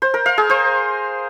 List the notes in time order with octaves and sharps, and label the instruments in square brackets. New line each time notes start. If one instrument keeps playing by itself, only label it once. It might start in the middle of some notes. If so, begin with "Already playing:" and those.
[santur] C5
A#4
F5
G#4
C5